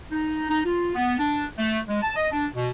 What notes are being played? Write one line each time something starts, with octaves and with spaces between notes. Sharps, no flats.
D#4
D#4
F4
B3
D4
A3
G#3
A5
D#5
D4
B2